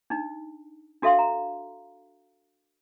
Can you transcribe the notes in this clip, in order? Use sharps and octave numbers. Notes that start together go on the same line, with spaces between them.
D4 D#4
D4 F#4 A4 E5 F5 C6
A#5